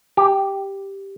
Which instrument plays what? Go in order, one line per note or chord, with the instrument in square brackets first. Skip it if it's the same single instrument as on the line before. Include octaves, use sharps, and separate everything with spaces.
[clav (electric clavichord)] G4